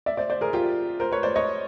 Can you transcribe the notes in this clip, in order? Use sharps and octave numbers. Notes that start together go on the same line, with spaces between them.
D5 E5
C5 D5
C5 D5
G#4 A#4
F4 G4
A#4 C5
B4 C#5
C5 D5
C#5 D#5